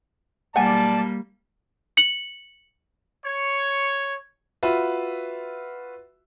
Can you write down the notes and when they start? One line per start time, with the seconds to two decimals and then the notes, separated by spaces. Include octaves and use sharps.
0.56 B1 G3 A#3 D5 F#5 G#5 A5
1.97 C#7 F#7
3.24 C#5
4.63 F4 F#4 B4 E5